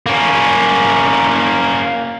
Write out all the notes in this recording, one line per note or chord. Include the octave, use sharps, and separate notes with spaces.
A#3 C#4